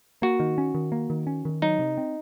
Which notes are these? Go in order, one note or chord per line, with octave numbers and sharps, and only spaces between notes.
A#3 F#4
D#3
C#4
D#3
A#3
D#3
C#4
D#3
F#3 D#4
C3
C4